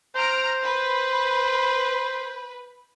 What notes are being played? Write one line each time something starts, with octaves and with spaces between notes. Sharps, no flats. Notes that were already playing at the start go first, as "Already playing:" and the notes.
C5 A#5 F6 D7
B4